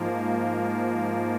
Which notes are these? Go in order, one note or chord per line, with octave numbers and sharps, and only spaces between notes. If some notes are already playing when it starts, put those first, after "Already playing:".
Already playing: G#2 F3 A#3